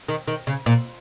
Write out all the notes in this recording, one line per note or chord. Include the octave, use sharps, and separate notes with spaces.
D#3
D#3
C#3
A#2